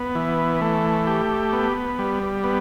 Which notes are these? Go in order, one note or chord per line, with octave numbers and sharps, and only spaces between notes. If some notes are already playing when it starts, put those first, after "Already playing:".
Already playing: B3
E3
A3
G4
B3
G3
B3